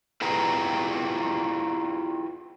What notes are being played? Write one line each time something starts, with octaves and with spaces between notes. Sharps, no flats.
E4 F4 G4 G#4 B4 A#5